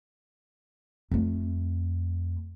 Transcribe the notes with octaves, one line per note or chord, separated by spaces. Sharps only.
F2 A3